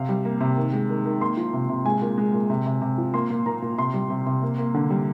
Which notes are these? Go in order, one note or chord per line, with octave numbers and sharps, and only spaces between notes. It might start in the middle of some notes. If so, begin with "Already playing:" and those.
Already playing: C3 F5
G3
A#3
C3
D#3
G#3
D#3
D#3
A#3 C6
F3
C3
C3
G#3 G#5
A#2
G#3
A#2
C3
C3
C3
F3
A#3 C6
A#2
A#2 A#5
A#2
C3 C6
G3
C3
C3
A#3
A#3
D3
G3